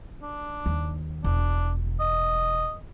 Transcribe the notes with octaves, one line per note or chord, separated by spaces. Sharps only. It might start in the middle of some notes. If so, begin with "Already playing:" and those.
D4
D#2
E1 D4
D#5